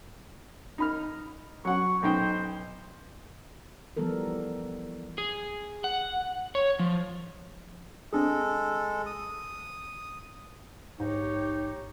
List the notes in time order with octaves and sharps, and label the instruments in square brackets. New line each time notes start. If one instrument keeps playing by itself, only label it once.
[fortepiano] D#4 B5 F6
[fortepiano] F#3 F#5 [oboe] C#6
[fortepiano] B1 D#4 G5 [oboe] C5
[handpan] E3 F3 G3 B3 A4 A#4
[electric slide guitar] G#4
F#5
C#5
F3
[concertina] G#3 A4 [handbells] C4 D4 G#4
[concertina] D#6
[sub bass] A#1 [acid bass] G#2 [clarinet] D#4 [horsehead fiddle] G4 C#5